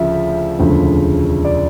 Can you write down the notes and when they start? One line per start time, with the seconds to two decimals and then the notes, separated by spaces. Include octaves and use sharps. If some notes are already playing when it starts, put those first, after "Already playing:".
Already playing: D2 C#3 F3 E5
0.59 E1 D2 C#3 F3
1.44 D5